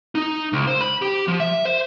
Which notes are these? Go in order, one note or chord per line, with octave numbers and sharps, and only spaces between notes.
D#4
C#2
C5
B5
G4
F3
E5
C5